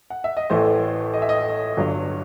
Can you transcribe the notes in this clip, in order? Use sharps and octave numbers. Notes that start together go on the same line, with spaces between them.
F#5
E5
D#5
A1 A2 E3 A3 C5
D#5
E5
D#5
G1 G2 F#3